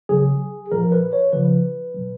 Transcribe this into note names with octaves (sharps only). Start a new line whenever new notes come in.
C#3 F#3 G#4
A#2 F3 A#4
B4
C#5
C#3 F3 B4
B2 F#3